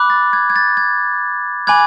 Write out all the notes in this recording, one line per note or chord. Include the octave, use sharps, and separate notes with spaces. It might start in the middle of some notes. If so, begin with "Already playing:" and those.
Already playing: B5 D6 F#6
A6
G#6
G#6
A6
G#6
G#5 B5 D6 F#6 G#6